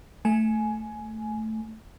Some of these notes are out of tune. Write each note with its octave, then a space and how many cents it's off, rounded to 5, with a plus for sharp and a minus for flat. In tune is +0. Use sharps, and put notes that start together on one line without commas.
A3 +0 G#5 +15